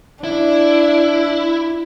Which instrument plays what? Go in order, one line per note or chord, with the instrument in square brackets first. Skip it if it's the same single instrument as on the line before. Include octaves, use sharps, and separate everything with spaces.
[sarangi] D4 [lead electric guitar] E4